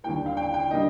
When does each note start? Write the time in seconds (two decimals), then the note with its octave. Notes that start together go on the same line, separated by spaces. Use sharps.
0.04 D#2 D3 G3 A#3 G5
0.26 F5
0.37 G5
0.54 G5
0.71 D3 G3 A#3 D#5